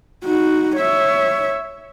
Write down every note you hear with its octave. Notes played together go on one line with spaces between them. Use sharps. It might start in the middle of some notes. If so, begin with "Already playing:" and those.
D#4 F#4
C#5 E5